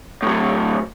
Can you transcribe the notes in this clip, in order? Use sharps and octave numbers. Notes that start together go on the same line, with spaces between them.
A2 F#3